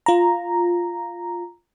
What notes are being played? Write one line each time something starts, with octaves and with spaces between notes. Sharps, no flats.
F4 A#5